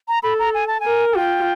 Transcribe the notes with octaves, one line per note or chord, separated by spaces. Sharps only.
A#5
A4 B5
A#5
G#5
A5
G#5
A#4
G#5
F4 G5